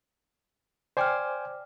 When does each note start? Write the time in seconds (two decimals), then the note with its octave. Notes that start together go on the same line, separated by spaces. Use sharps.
0.97 C5 D5 G5 G#5 D6 F6